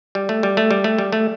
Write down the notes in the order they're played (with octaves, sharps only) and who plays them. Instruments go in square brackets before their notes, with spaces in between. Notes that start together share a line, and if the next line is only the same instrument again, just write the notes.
[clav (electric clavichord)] G3
A3
G3
A3
G3
A3
G3
A3